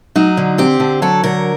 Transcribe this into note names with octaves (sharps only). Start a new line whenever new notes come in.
F#3 D#4
D3
C4 G4
D3
F#3 A4
D3 A#4